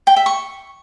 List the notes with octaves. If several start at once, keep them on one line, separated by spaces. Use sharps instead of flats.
G5
E5
C#6